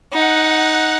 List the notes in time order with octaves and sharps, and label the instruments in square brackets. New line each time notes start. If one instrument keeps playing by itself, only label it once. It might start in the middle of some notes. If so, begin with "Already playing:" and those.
[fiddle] D#4 [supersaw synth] F#5